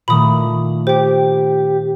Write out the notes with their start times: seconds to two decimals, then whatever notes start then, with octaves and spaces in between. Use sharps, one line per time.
0.08 A#2 D#3 A3 B5 D#6
0.87 G4 C5 G5